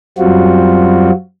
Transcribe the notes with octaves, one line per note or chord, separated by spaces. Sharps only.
F#2 F#3 G3 C4 F4 F#4